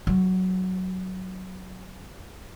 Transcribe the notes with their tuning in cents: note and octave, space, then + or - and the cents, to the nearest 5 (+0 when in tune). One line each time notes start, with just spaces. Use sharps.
F#3 +5